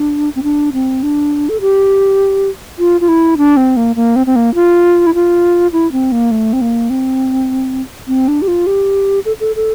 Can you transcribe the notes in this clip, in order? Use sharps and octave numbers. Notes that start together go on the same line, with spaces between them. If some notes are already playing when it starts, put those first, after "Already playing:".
Already playing: D4
C4
D4
C4
D4
A4
G4
F4
F4
E4
D4
C4
A#3
A#3
C4
C4
A#3
F4
E4
F4
E4
C4
A#3
A3
C4
A#3
C4
C4
D4
G4
F4
G4
A4
A4
A4